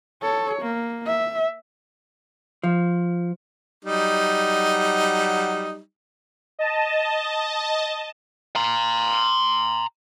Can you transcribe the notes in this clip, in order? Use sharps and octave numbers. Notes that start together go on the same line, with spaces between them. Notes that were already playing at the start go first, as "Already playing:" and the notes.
A4 C#5
A#3
E5
F3
F#3 G3 D#4
D#5 A5
A#5 C6